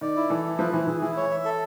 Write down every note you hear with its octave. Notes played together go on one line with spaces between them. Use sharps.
D#3 D5
E4
E3 A4
E4
F3 B4
E3 E4
E3 G#4
E3 E4
C#5
E5
A4